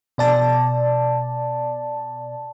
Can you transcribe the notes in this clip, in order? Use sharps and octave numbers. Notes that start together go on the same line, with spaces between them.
B2 D5 A5